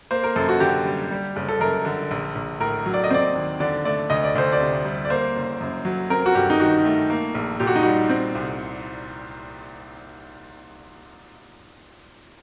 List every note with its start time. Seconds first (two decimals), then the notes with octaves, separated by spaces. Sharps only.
0.11 A#3 C5
0.24 A#4
0.36 F#2 A4
0.49 F#4
0.60 D3 G4
0.85 G3
1.11 G3
1.36 F#1
1.49 A4
1.60 F#2 A#4
1.85 D3
2.11 A#1
2.35 A#1
2.60 A2 A#4
2.86 F#3
2.94 D5
3.04 D#5
3.10 C4 D5
3.35 D#2
3.60 D3 D5
3.85 A3 D5
4.10 D2 D#5
4.24 D5
4.35 D2 C5
4.52 D5
4.60 C3
4.85 G3
5.05 D5
5.10 A#3 C5
5.36 F#1
5.61 F#2
5.85 F#3
6.10 C4 A#4
6.26 F#4
6.35 G2 G4
6.50 D#4
6.60 D#3 F#4
6.85 A3
7.10 A#3
7.35 A#1
7.60 A#2 G4
7.67 F#4
7.76 D#4
7.83 G3 F#4
8.09 C4
8.35 C2